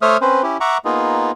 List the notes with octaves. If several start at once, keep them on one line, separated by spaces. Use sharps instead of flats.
A3 C5 C#5 E5 D#6 F6
C4 C#4 B4 C5
C#4 E4 G4
E5 F#5 A#5 C#6 D6
A#3 B3 D#4 F4 G#4